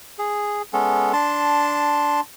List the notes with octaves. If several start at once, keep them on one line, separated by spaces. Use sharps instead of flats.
G#4
G#3 B3 C#4 A4
D4 A5 C6